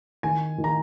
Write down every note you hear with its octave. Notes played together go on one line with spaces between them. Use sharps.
D#3 G#5
D#3
A#5